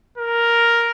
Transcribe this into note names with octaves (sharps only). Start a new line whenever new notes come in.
A#4